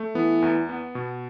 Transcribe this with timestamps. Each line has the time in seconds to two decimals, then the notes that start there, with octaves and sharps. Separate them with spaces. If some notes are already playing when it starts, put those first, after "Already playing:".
Already playing: A3
0.15 E3 B3
0.42 E2
0.69 B3
0.95 B2